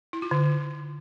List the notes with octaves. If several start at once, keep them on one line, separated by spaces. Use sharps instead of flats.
E4
F4
D3